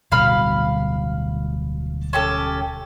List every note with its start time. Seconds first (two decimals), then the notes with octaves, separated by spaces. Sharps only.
0.12 D1 B2 G3 F5 B5 F6
2.13 C#4 G4 A4